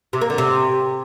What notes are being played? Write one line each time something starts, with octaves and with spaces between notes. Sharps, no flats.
C3
A#3
D3
C3